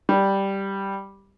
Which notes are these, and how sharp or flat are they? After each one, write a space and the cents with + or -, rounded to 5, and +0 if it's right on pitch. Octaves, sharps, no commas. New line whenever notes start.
G3 +0